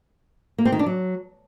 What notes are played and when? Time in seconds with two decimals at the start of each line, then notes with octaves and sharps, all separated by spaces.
0.58 A#3
0.65 C4
0.72 D#3
0.79 D4
0.86 F#3